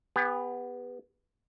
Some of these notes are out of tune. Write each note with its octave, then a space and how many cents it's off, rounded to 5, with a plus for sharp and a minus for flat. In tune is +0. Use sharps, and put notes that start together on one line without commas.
B3 +0 G4 +45